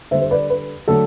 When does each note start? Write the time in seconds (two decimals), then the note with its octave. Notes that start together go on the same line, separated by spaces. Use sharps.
0.11 D3 C5 E5
0.14 G3
0.21 C5
0.31 B4 D5
0.50 B4
0.88 D3 F#3 A3 A4